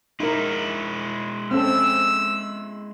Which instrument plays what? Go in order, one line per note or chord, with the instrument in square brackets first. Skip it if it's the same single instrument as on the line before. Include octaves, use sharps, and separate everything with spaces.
[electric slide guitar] G#3 E4 [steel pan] D#4 A#4
[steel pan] C4 C#4 A4 [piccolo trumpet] E6